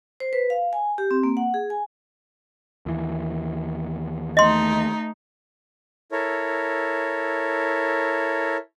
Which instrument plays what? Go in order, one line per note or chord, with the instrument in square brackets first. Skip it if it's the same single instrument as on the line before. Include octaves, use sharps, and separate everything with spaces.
[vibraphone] C5
B4
F5
G#5
G4
C4
A#3
F#5
G#4
G#5
[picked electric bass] D#2 E3
[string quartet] A3 D#4 [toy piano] D#5 C6
[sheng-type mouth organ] E4 A4 A#4 C#5